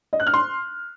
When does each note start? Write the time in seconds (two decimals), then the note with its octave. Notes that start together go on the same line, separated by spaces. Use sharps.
0.13 D#5
0.20 F#6
0.27 F6
0.34 C6